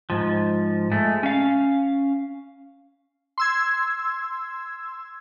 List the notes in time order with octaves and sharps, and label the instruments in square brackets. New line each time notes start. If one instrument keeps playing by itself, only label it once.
[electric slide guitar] G#2 F3
G#3 A3
C#4 F5
[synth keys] C6 E6 G#6